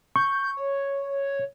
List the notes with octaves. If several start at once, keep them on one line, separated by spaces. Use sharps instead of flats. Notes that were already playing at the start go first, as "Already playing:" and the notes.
C#6 G6
C#5